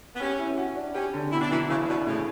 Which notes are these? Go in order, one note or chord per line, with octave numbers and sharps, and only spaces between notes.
B3
C#4 G4
E4
F#4
D4
C#4 G4
D3
B2 E4
D4
E3 F#3
C#3 E3
B2 D4
A2 C#3